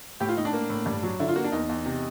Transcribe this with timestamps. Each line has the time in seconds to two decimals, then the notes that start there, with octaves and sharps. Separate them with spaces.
0.20 A2 G4
0.29 F4
0.37 A2 D#4
0.45 D4
0.53 A#3
0.69 A2
0.86 G2
1.03 F#3
1.19 D3 E4
1.28 F4
1.36 A#3 F#4
1.44 D4
1.52 E2 D#4
1.69 E2
1.86 C3